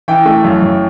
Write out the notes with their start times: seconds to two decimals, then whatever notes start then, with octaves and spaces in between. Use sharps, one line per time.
0.08 E3 G5
0.25 A3
0.44 F#2
0.62 F#2